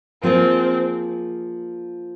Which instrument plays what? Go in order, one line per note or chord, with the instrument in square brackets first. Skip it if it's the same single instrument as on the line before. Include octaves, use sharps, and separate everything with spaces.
[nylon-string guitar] F3 A#3 F4 G#4 [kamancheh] C4